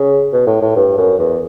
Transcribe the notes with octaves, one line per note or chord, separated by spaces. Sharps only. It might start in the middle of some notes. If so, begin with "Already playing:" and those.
Already playing: C#3
B2
A2
A2
G2
F#2
E2